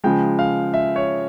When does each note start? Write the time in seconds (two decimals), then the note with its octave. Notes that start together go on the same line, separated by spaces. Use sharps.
0.04 C#3 F3 G#3 G5
0.39 F5
0.74 E5
0.96 C#5